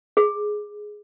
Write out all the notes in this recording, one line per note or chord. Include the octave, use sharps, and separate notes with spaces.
G#4